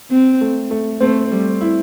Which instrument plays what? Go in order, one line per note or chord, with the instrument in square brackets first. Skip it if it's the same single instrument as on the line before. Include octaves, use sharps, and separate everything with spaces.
[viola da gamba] C4
[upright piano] A3
A3
[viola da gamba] A3 [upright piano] C4
[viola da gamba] G3
[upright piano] E4